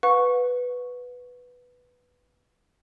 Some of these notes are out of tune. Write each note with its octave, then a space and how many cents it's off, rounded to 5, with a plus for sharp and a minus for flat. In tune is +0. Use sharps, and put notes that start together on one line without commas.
B4 +0 F#5 -45 C#6 +0